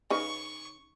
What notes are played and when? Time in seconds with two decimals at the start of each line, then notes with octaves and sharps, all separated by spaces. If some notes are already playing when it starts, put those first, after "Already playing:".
0.10 C#3 D#4 B4 C#6